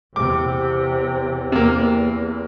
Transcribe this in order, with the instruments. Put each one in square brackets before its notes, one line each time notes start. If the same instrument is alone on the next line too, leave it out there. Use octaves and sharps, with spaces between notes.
[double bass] E2 C3 [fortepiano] D6
[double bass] E2 [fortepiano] C3 A#3